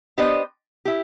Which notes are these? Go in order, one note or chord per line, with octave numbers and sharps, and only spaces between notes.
B3 D4 G4 C5 D#5
E4 G4